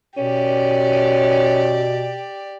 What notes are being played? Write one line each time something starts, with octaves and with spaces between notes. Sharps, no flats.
B2 C#4 G4 D5